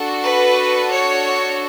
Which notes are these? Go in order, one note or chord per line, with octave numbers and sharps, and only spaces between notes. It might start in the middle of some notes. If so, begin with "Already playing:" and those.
Already playing: D4 F#4 A4
B4
C#5